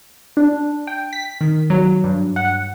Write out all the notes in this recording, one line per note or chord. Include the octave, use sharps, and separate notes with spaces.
D4
G5
B6
D#3
F#3
G2
F#5